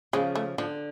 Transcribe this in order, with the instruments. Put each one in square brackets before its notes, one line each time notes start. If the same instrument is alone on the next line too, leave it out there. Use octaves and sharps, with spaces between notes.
[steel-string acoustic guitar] C#3 F3 [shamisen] G#3
[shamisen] A3
[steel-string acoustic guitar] D3 [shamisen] F3